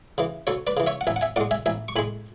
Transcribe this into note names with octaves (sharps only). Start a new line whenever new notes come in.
C#3 E3
D2 A4 C#5
B4 D5
C#3 E3
C#5 E5
F#5
A1 E5 G#5
F#5
E5 G#5
A2 G#3 D5 F#5
E5 G#5
A1 E5 G#5
C#6
A2 G#3 G#5 B5